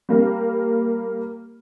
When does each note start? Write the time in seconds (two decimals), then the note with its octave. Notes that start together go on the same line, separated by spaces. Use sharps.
0.09 G3 A#3 A#4